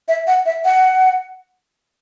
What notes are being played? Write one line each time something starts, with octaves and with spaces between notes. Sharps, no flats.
E5
F#5
E5
F#5